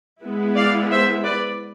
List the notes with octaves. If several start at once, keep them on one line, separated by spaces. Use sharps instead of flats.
G#3 B3 E4
D5 F5
C5 E5
B4 D5